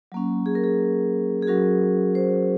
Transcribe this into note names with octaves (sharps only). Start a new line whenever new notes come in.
F#3 A#3 C#4
G#4
A#4
G#4
G#4
F#3 C#4 F#4 A#4
C5